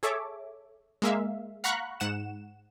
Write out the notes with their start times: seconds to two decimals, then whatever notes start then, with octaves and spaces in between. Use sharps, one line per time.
0.03 G#4 A4 C#5 E5 D6
1.02 G#3 A#3 E5 F5
1.64 F5 F#5 A#5 B5 C#6 F#6
2.00 G#2 F#5 E7